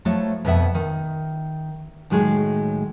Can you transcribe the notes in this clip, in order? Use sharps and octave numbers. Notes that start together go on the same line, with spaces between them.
F3 F#3 A3 E4 C#5
F2 B2 B4 E5 F#5
D#3
A2 D#3 F#3 G#3 A3 G#4